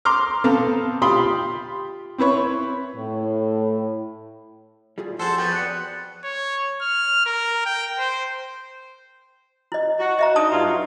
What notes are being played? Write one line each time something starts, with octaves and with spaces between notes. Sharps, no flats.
A#5 C6 D6 F6
B3 C4 A4 F5 A#5
F4 G4 G5 B5 C6 D#6
C4 E4 B4 C#5
A2
G3 F4 G#4
F2 G#4 A4 C5 F#5 A5 C6
B3 F#4 G5 G6 A6
D5 F#6 C#7
C#5
F6
A#4
G5
C5
E4 D#5
F#4
D#5 E5 A#5
D4 D#4 A5 D#6
G2 F4
F#3